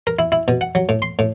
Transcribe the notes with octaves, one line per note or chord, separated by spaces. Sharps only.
A#4
E4
E4
B2
F#5
F#3
A2
C6
A2